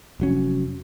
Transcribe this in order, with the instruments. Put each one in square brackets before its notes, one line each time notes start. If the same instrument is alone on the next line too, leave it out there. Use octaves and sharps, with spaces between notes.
[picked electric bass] F1 F#3 C#4